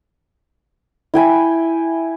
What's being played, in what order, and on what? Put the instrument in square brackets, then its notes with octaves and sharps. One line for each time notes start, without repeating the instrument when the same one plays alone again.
[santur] E4 G5 G#5 B5